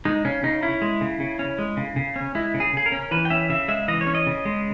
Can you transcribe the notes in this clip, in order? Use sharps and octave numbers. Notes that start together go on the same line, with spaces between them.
G#3 D#4
C#3 C#4
C#3 D#4
C#4 E4
G#3
C#3
C#3
C#4
G#3
C#3
C#3
C#4
G#3 E4
C#3
G#4
C#3 G#4
A#4
C#4
E3 B4
G5
C#4 E5
C#3 E5
G#3 E5
E3 D#5
C#5
C#4
D#5
C#3
G#3